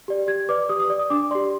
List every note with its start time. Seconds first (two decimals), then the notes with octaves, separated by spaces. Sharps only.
0.08 G4 D5
0.27 G4 G#6
0.49 B4 D5 D6
0.69 G4 D#6
0.80 D#6
0.90 D5
0.99 D#6
1.10 D4 D6
1.31 D5 C6
1.35 G4